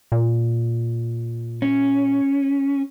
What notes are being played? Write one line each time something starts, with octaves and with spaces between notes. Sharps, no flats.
A#2
C#4